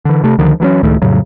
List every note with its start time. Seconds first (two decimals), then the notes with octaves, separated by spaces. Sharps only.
0.05 D3 E3
0.24 C3 A3
0.38 C#2 D3 D#3 F3
0.60 E3 F#3 A#3 C#4
0.83 C#2 A2 D#3 A3
1.02 F2 A2 C#3 F#3